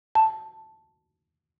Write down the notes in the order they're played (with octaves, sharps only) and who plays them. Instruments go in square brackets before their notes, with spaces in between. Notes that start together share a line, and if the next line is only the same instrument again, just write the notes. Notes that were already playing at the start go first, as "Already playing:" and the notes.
[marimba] A5